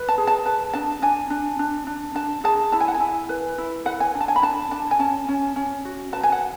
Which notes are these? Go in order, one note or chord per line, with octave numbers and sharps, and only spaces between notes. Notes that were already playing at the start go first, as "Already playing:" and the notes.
Already playing: B4
A5
G#4
A5
B4 A5
D4 A5
D4 G#5
D4
D4
D4
D4 A5
G#4 A5
E4 A5
G#5
F#5
G#5
E4
B4
E4
B4 F#5
G#5
D4
A5
G#5
B5
D4 A5
D4 A5
G#5
C#4 A5
C#4
C#4
F#4
B4 A5
G#5
F#5